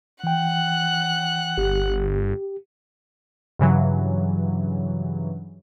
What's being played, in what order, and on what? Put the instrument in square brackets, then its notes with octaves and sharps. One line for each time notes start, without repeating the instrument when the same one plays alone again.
[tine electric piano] E3 G5 [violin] F#5 F#6
[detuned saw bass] G1 [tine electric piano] G4
[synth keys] G2 C#3 E3 F#3